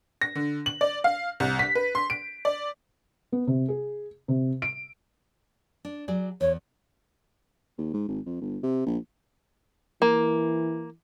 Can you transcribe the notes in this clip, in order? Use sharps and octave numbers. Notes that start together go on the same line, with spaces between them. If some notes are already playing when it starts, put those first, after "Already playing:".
A#6
D3
F#7
D5
F5
C2
B6
B4
C6
D7
D5
B3
C3
G#4
C3
D7
D4
F#3 G#4 D5
E2 C#5
D#2
G#2
G#1
F2
G1
C3
A#1
E3 A#3